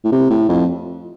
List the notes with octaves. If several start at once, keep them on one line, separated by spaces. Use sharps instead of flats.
A2
C3
A2
F2